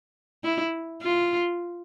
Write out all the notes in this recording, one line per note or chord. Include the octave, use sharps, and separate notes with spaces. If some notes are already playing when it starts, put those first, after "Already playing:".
E4
F4